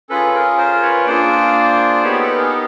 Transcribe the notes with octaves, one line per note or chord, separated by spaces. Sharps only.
C#4 F4 G#4 A4 B4
G#4 A#4
A#4 C5
B4 C#5
A#3 D4 F4 G#4 C5 D5
B3 D#4 G4 B4 C#5
A4 B4
G#4 A#4